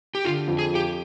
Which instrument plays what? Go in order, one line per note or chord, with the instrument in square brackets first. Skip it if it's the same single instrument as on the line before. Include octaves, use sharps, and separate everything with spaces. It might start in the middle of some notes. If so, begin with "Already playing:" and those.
[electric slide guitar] G4
[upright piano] D3 [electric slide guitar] F4
[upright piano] F2
[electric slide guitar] G#4
[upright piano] F3
[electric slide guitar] G4